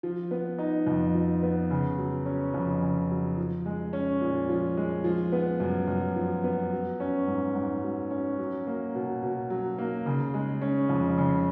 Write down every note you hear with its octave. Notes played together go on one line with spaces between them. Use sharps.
F3
B3
D#4
F2
F3
B3
C#3
F#3
C#4
F2
C#3
F#3
F3
G#3
C#4
A#2
F3
G#3
F3
B3
F#2
F#2
F3
B3
F#3
C#4
G#2
G#2
F#3
C#4
F#3
A#3
B2
B2
F#3
A#3
C#3
G#3
C#4
F2
C#3